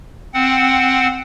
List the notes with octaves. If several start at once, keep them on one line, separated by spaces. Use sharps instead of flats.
C4 F#5